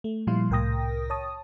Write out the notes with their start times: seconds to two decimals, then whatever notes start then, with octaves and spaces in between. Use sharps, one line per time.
0.04 A3
0.27 A#2 F3 G3 E4 F5 C6
0.50 C2 A2 A#4 G5 D#6 A#6
1.10 C#5 A5 D#6